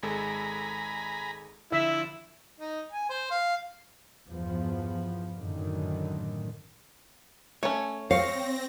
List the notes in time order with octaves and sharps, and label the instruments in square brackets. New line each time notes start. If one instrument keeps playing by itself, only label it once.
[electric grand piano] G#1 G#3 A4 [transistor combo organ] G#5 A#5 B5
[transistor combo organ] D3 F3 [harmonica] E4 [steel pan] E5
[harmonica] D#4
G#5
C5
F5
[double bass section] E2 G2 F3 B3
F#2 A2 D3 D#3
[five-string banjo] A3 C#4 [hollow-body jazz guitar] C#5
[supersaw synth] C4 A#6 [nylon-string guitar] C#5 [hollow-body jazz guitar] F5